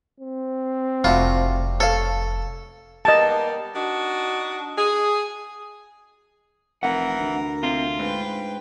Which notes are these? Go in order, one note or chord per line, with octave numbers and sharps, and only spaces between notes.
C4
F1 G3 A3 F4 F#4
A4 C#5 F5
G3 A#3 B3 D#5 A5
D4 D#4 F#4
G#4
F1 E3 A#4 F#5
D2
C3 F4
G#2 B4 G5